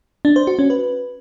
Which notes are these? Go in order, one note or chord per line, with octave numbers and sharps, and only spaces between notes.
D4
C5
F#4
C#4
B4